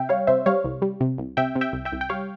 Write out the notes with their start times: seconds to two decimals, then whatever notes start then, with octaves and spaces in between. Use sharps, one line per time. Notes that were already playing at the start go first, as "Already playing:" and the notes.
Already playing: C3 E5 G5
0.09 G3 C#5 F5
0.27 C3 C5 E5
0.46 G3 C#5 F5
0.64 C2
0.82 G3
1.00 C3
1.18 C2
1.37 C3 E5 G5
1.56 C3
1.61 E5 G5
1.73 C2
1.85 E5 G5
1.92 C2
2.01 G5
2.09 G3 C#5 F5